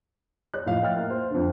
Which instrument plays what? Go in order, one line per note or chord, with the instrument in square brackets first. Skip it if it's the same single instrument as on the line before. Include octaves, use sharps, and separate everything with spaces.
[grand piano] C#5 F#6
A2 F3 D#5 F5
D#5 E5 G5 F6 A6
A#3
C5
F2 D3